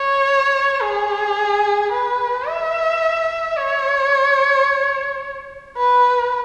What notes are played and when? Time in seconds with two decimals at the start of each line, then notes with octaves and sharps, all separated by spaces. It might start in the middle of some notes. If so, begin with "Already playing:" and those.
Already playing: C#5
0.82 G#4
1.92 B4
2.47 E5
3.57 C#5
5.77 B4